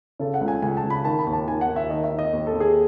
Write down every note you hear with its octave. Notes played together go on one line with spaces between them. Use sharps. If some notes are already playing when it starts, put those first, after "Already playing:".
C#3 A4
F#5
C#2
G#5
C#2 G#5
A5
C#2
B5
D#3 A5
B5
D#2
A5
D#3 G#5
F#5
D#2
E5
D#3 D#5
E5
D#3
D#5
D#2
A4
D#2
G#4